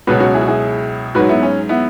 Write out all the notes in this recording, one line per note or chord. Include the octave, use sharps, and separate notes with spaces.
C#2 B2 F#3 F#4 B4
C#4 F#4
E4 G#4
F#4
E4 G#4
G#2 F#3 F#4 B4
B3 E4
C#4
B3 E4